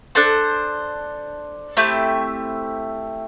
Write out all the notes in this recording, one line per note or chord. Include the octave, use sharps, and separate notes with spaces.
D4 A4 C5
A3 C4 E4 G4